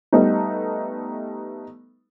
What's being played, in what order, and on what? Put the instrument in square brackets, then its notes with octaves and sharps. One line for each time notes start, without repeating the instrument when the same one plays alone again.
[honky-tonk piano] G3 A3 B3 D#4